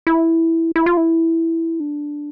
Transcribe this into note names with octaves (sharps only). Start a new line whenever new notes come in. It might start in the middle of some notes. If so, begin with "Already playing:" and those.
E4
E4
F4
E4
D4